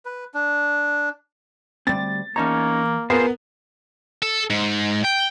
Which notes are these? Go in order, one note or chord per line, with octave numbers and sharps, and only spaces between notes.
B4
D4
D2 G3 C4 A6
E2 A#3 C#4 D#4 C#5 A5 A#5
B3 F4 G#4 A#4 C5
A4
G#2
G5